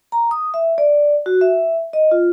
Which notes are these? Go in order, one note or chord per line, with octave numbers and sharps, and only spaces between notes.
A#5
D#6
E5
D5
F#4
E5
D#5
F4